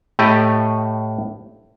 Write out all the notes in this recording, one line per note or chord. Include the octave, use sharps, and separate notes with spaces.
A2 A3 G4 D#5